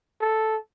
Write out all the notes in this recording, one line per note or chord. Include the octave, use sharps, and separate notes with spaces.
A4